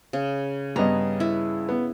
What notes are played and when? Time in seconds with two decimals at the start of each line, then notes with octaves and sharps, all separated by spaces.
0.13 C#3
0.76 G2 B3 D#5 A#5
1.20 E4
1.69 B3